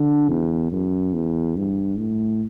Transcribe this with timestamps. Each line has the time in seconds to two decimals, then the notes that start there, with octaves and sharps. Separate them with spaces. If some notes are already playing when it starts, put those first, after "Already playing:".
Already playing: D3
0.29 E2
0.72 F#2
1.14 E2
1.56 G2
1.98 A2